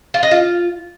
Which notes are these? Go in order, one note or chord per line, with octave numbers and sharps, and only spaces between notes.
F4
D#5
F4